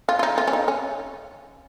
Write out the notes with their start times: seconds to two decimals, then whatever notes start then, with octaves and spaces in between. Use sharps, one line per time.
0.09 F4
0.19 F4
0.23 D#4
0.38 F4
0.48 C#4
0.53 D#4
0.68 C#4